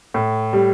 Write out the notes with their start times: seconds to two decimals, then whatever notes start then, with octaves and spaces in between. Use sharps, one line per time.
0.14 A2
0.53 G3